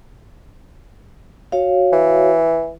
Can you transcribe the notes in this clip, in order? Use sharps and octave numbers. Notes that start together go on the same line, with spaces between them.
F#4 C#5 F5
E3